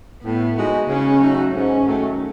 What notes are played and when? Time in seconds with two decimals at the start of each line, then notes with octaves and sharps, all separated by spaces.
0.23 A2 B3
0.55 G#3 D#4 F#4
0.88 C#3 C#4
1.20 F#3 A3 D#4 F#4
1.53 G#2 C#4
1.85 D#3 F#3 A3